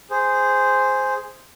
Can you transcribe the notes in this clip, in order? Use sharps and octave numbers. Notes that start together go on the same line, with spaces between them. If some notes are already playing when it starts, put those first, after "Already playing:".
G#4 C5